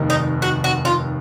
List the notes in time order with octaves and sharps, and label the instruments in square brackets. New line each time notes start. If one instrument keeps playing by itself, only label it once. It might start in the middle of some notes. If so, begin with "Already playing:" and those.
Already playing: [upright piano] F1 D#2 D#3
[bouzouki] D#4
F#4
F#4
F4